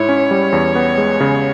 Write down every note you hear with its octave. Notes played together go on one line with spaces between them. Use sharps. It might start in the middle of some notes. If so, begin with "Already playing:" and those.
Already playing: G#2 E4 C#5
C#4
G3
E2
B3
G#3
C#3